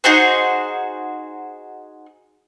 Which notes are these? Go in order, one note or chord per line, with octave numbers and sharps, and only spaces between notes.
D#4 F#4 G#4 C5